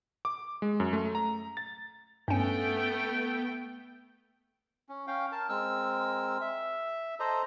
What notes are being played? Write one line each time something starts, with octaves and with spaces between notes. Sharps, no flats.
D6
G#3
F#2
A3
A#5
A6
G2 A3 B3 C#4 G5
C#4
C#4 F5 G5
A#4 A5
G#3 C4 A#4 E6
E5
A4 C5 D#5 A#5